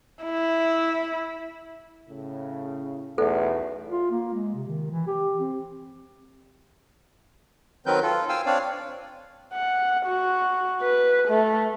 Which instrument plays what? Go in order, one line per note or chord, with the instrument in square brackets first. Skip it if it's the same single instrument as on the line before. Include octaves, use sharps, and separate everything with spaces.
[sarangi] E4
[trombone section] A2 C#3
[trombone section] B1 A3 [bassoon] E2 [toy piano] A4
[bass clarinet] F4
A#3
G#3
C3
D#3
E3
G4
C4
[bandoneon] D#3 F#3 C4 A#4 B4 G6
F4 A4
F5 G5 G#5 E6
C4 D4 C#5 D5 F5
[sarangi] F#5
F#4
B4
A3